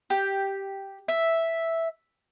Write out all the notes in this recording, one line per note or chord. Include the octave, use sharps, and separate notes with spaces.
G4
E5